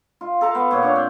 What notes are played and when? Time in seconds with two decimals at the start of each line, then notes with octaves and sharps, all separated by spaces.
0.21 F4
0.41 A4 A#4 F5 A5
0.55 B3
0.71 A#2 C#5
0.83 C#4 D4
0.95 C4